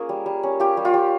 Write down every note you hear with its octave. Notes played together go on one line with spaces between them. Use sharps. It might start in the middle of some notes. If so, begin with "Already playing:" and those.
Already playing: A#3 C#4 F4 G#4 A#4
G3
G3
C#4
F4 G4
G3
F4
G3